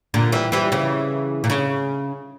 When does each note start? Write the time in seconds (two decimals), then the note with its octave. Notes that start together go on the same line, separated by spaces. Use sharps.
0.14 A#2 D3
0.32 E3 G3
0.52 E3 G3
0.72 C#3 E3
1.44 A#2
1.50 C#3